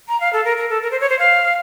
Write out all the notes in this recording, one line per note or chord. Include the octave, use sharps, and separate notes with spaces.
A#5
F5
A4
A#4
A#4
A4
A#4
C5
C#5
C5
F5